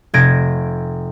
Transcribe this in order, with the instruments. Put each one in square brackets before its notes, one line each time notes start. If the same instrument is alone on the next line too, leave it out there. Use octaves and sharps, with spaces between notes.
[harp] F1 G#6 A#6 D7